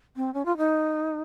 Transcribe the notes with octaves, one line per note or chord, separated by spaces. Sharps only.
C4
C#4
F4
D#4